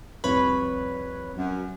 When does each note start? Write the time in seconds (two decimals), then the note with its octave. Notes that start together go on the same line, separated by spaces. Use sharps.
0.24 C2 F2 B4 C#5 B5
1.37 F#2